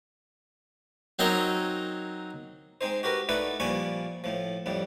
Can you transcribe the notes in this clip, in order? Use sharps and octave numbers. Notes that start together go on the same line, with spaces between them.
F#3 C4 D#4 A#4 C#5 D#5
G#3 C4 D#4 C5
F#4 G4 A#4 B4
A3 D#4 E4 B4 D5 F#5
A#2 F3 G3 G#5 B5 C#6
A2 F3
F2 A2 G3